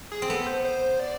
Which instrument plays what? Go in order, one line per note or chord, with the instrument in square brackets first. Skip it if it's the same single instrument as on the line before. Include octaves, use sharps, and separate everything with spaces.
[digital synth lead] G#4
[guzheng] C4
[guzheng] B3 [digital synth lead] A4
[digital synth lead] C5
C5
D5